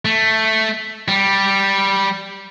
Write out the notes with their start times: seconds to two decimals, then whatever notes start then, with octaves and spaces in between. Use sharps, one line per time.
0.05 A3
1.08 G3